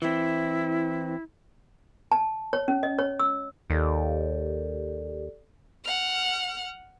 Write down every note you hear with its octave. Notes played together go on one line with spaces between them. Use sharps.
E3 C4 E4
A5
C#5
C#4
D#5
C#5
E6
D#2 G4 A4 D5
F#5 F6